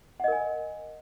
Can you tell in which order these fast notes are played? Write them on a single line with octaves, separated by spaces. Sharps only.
F#5 D#5 A#4 G#5